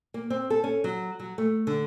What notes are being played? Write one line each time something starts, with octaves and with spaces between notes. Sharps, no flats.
A#3
C4
A4
C#4
F#3
F#3
A3
D3